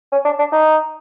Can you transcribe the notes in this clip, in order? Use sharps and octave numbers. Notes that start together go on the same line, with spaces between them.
C#4
D4
D4
D#4